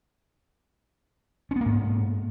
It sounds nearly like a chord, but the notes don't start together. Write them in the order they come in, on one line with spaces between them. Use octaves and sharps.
C#4 B3 A#3 G#2